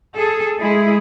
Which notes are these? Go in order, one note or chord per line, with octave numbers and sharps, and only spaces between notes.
G#4 A4
G#3 E4 G#4